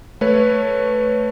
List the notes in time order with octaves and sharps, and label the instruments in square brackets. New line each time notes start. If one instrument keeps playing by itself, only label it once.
[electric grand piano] A3 B4 C#5